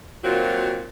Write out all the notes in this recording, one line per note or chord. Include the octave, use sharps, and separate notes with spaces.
A#2 D#3 F#3 C4 F4 F#4